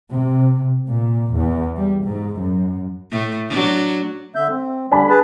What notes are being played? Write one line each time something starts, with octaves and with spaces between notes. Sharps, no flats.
C3
A#2
E2
G3
G#2
F#2
A2 A3
F#3 D4
D3 E5 G6
C4
D3 G3 D4 G#5 B5
G#4 B4 A5